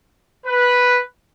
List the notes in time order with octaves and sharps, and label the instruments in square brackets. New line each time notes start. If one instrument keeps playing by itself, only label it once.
[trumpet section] B4